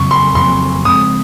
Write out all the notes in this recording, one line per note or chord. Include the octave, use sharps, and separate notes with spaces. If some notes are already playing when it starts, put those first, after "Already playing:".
Already playing: F2 C#3 F#3 C4 C#6
C6
F2 C#3 F#3 C4 C6
C#3 F3 G#3 C4 D#6